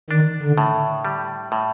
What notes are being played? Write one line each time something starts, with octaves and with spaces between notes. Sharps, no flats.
D#3 D4
D3
A2
G3
A2